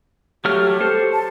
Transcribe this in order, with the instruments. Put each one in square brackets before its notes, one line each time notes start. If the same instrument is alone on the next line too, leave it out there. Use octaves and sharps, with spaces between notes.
[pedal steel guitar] F#3 A3 F6 [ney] G4
[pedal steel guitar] A4 C5
[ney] A5